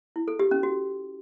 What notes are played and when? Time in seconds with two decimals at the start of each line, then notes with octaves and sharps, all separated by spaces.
0.16 E4
0.28 A4
0.39 G4
0.51 C#4
0.63 F#4